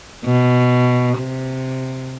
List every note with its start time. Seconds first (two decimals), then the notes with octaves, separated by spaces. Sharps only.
0.24 B2
1.18 C3